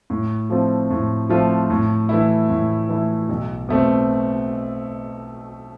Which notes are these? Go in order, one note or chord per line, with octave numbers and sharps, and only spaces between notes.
A2
F3 A3 C4 F4
A2
F3 A3 C4 F4
A2
E3 A3 E4
A2
E3 A3 E4
B1
B2 A3 C4